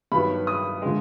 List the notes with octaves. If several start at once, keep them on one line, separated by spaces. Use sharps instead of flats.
G2 D#3 F#3 B3 B5
D#6
D3 F3 G#3